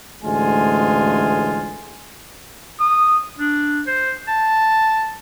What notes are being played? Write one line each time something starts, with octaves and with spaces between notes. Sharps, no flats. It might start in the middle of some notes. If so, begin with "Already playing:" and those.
A1 D2 G#3 F4 G#5
D#6
D4
C5
A5